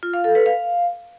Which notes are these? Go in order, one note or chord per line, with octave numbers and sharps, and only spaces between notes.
F4
F5
A4
B4
F5